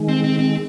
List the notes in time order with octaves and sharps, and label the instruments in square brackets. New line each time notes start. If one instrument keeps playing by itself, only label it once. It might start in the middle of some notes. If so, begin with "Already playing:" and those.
Already playing: [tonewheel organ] D#3 G#3
[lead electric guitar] C4
C4
C4